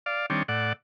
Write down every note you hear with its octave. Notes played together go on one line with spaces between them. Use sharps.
D5 F5
D#3 G3 C4 D4 C#5
A2 D5 F#5